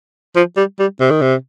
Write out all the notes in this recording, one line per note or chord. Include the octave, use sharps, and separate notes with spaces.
F3
G3
G3
C3
D#3
C3